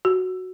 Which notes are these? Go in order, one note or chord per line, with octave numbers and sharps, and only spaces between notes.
F#4